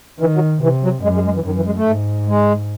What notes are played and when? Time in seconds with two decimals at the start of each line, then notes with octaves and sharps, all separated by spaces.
0.20 D#3 E3
0.34 F#3
0.62 C3 E3
0.83 F#3
1.03 F#2 G#3
1.14 G#3
1.25 G#3
1.35 E3
1.45 F#2 D#3
1.56 E3
1.66 G#3
1.76 A3
1.86 G#2
2.28 G#3